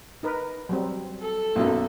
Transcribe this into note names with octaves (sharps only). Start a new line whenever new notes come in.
D#4 A#4 B4
F#3 G3 C4
A4
B1 F#2 A#3 E4